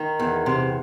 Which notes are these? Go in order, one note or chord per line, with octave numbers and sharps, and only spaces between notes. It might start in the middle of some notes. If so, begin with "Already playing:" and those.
Already playing: D#3
E2
C3